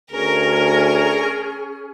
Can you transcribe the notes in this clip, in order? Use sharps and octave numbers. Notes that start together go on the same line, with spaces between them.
D2 C#4 G#4 A#4 A#5